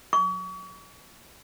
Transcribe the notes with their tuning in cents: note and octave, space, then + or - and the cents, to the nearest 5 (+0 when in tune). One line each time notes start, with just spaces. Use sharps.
C#6 +40